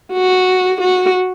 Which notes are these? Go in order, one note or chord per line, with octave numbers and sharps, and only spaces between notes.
F#4
F#4